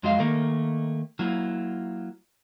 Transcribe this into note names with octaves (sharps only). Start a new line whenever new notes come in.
F2 F#3 G#3 F4 D#5 F5
D#3 A3 A#3 A#4
F#3 A#3 E4 F4